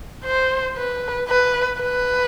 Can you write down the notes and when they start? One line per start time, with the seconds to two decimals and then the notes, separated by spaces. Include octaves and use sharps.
0.25 C5
0.76 B4
1.29 B4
1.81 B4